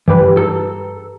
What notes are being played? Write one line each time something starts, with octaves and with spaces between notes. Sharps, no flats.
G2 E3 G4 B4
A4 A#5